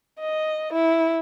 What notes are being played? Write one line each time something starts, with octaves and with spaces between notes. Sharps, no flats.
D#5
E4